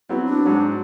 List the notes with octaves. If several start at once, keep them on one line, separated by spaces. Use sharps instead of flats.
F#3 B3 C4 E4
D4
G#2 F#3